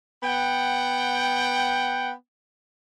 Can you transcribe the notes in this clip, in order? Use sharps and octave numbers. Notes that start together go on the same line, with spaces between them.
B3 F#5 G5